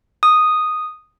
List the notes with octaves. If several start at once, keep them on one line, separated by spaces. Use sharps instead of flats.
D#6